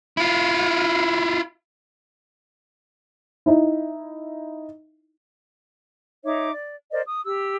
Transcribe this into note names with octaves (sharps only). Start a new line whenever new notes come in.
E4 F4
D#4 E4
D#4 C#5 E5 D6
D5
A#4 C5 D5 D#5
D#6
G4 E6